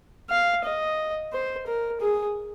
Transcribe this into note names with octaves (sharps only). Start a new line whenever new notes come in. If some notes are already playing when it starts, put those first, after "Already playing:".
F5
D#5
C5
A#4
G#4